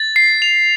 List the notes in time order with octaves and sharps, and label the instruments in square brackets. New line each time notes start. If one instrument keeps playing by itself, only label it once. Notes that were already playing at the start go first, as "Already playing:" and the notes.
Already playing: [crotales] A6
C7
F7